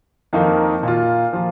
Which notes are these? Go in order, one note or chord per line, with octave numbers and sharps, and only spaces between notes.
F2 D#3 A#3 D#4 A#4
A#2 A#3 F4
F3 A#3 F4